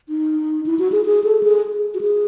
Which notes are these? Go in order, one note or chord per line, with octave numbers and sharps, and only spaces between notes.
D#4
E4
F#4
G#4
G#4
A4
G#4
F#4
G#4